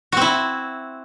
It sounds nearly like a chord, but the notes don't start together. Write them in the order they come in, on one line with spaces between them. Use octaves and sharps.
F#4 C4 E4